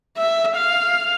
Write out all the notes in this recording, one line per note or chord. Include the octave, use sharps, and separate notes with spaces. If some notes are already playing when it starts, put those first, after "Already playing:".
E5
F5